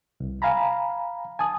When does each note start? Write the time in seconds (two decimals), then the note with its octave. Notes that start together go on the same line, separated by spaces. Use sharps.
0.20 C2
0.42 F5 G#5 A#5 B5
1.39 G#5 A5 D#6